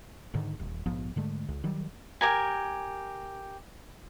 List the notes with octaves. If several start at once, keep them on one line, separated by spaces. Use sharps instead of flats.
G#2 D3 D#3
D#1
A#1 G#2 F3 B3
G#2 D3 G#3 A3
C#2
D#3 F#3 G3
G4 A#4 G#5